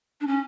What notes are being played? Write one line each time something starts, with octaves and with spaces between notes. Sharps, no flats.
D4
C#4